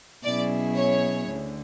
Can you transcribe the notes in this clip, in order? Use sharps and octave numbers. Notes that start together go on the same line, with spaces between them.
B2 F#3 C#4 E4 G#4 D5
C#5
D2 D3